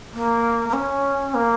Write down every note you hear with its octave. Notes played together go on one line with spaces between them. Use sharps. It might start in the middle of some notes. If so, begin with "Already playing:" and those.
A#3
A#3
C#4
A#3